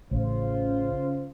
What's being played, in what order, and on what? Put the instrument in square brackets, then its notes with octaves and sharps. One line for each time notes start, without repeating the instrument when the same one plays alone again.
[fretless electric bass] A1 [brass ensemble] C#3 F4 C5